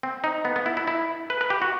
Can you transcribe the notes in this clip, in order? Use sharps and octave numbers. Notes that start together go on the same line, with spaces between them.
C4
D#4
B3
B3
E4
E4
E4
B4
B4
G4
F#4